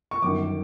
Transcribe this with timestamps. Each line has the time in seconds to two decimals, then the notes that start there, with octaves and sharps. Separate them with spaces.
0.11 C#6
0.22 G1 F#2 D#3 D6